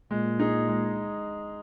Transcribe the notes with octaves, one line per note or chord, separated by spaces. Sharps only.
A#2 G#3
D#4 G#4
G#3